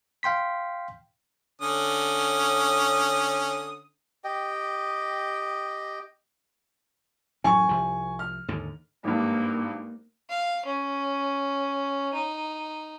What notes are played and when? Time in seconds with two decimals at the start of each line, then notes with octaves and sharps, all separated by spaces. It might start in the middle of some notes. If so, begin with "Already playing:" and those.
0.23 F5 G5 C6 B6
1.61 D3 C#4 D#6
4.24 G4 D#5 G5
7.44 A1 F#2 A2 G#5 C#6
7.69 C2 F3
8.19 F6
8.48 D#2 G#2 D3
9.04 G#1 G2 A#3
10.29 F5
10.66 C#4
12.14 D#4